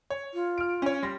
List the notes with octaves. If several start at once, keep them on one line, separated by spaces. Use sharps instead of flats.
C#5
F4
F6 D7
C#4 C#5
G3 C6 A#6